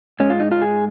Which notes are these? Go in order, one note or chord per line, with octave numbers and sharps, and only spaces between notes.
G#2 G#3 C#4
F4
D#4
F4
G#4